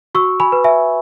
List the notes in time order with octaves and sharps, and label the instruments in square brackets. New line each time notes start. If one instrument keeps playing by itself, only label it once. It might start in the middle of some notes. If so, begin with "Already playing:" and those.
[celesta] F#4 C#6 E6
G#5 B5
B4
E5 G#5